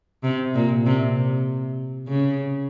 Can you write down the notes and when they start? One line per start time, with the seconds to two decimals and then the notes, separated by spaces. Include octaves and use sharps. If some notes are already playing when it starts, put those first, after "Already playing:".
0.24 C3
0.55 A#2
0.86 C3
2.08 C#3